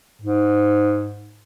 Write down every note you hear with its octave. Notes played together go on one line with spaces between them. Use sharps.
G#2